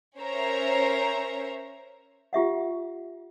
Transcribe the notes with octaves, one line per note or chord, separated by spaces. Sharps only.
C#4 A#4 C5 C#5 E5 A#5
F4 G4 E5 F#5